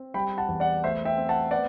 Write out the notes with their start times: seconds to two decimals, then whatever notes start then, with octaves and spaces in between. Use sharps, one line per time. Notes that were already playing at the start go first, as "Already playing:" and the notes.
Already playing: C4
0.14 G3 G5 B5
0.38 F#5 A5
0.48 E2
0.60 D5 F#5
0.83 A3 C5 E5
1.05 E5 G5
1.17 C4
1.29 F#5 A5
1.51 B3 D5 F#5